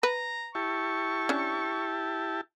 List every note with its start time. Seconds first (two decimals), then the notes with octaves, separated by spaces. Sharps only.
0.03 B4 A#5
0.55 E4 G4 A5 C#6
1.29 C#4 D4